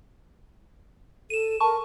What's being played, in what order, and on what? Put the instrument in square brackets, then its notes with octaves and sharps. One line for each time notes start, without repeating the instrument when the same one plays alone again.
[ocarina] A4 [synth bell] D#7 E7
[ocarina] A#4 [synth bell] A5 C#6